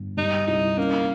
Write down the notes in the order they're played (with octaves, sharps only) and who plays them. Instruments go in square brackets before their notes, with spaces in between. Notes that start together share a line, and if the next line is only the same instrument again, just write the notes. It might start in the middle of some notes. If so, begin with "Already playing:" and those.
Already playing: [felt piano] G1
[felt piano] G3 [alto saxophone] D#4
[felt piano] C2 [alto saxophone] D#4
[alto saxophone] A#3 [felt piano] C#4